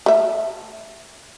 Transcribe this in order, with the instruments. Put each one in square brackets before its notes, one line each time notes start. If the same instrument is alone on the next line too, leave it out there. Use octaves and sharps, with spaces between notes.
[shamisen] A3 E5